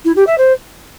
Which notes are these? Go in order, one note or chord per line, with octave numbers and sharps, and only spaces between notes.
E4
G4
E5
C5